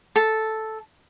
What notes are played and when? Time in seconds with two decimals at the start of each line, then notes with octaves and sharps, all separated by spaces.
0.16 A4